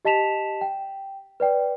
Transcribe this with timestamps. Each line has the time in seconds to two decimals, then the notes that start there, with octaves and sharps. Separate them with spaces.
0.05 G4 D#5 A5 B6 E7 F7
0.61 G5
1.40 B4 D5 G5